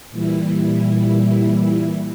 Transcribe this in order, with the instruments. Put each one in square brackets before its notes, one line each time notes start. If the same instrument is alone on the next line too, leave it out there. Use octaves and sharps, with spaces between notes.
[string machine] A#2 E3 G3 E4